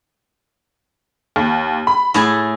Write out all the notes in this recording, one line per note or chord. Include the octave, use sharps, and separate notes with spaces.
D#2
B5
A2 A3 G#4